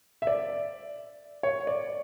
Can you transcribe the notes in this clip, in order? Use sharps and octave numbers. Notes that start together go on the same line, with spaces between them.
E5
D5
C#5
D5